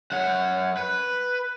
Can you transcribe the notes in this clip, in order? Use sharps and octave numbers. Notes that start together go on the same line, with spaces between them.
F#2 F#5
B4